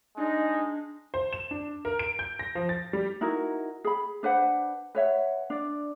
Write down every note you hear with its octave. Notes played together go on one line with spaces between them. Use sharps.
G#3 D4 D#4
C5
E7
D4
A#4
D7
G6
A#6
F3
A6
G3
D#4 E4 F#4 A#4
G#4 B5
D4 B4 C5 F#5
B4 C#5 E5 F#5
D4 D5